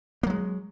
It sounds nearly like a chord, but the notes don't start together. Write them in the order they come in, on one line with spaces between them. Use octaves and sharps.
A#3 F#3 G#3